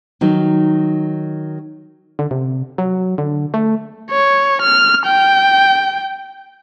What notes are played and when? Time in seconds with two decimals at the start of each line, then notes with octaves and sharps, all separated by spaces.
0.21 D#3 F#3 D#4
2.19 D3
2.31 C3
2.78 F#3
3.18 D3
3.54 A3
4.11 C#5
4.62 F6
5.06 G5